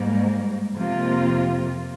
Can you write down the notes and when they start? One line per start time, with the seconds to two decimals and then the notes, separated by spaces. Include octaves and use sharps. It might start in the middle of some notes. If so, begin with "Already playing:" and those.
Already playing: G#2 G3 A#3
0.76 F2 C3 F3 A#3 F4